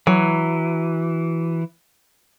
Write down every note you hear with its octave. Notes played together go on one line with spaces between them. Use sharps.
E3 F#3